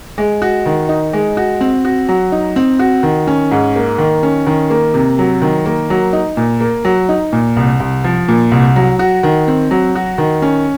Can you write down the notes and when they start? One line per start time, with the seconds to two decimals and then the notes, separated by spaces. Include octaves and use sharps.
0.18 G#3
0.42 F#4
0.66 D#3
0.89 D#4
1.13 G#3
1.37 F#4
1.61 C4
1.85 F#4
2.09 F#3
2.32 D#4
2.56 C4
2.79 F#4
3.03 D#3
3.27 C#4
3.51 G#2
3.76 A#3
3.98 D#3
4.23 C#4
4.47 D#3
4.70 A#3
4.94 C3
5.19 F#3
5.42 D#3
5.66 A#3
5.90 F#3
6.13 D#4
6.37 A#2
6.61 A#3
6.85 F#3
7.09 D#4
7.33 A#2
7.56 C2
7.80 C2
8.04 F3
8.28 A#2
8.52 C2
8.76 F#3
8.99 F#4
9.23 D#3
9.48 C4
9.71 F#3
9.95 F#4
10.18 D#3
10.42 C#4